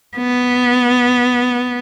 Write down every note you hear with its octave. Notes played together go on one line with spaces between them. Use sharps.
B3